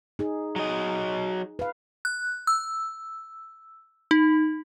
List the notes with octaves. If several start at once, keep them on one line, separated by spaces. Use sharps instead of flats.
D#4 G#4
F#3 D#5
B4 F5
F#6
E6
D#4